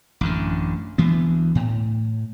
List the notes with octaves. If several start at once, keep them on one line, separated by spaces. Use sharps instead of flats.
A1 F#2 D3
D2 E3 B3
A2